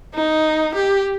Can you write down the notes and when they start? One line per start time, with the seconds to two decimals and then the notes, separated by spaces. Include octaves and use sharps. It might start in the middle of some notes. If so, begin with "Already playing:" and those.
0.14 D#4
0.75 G4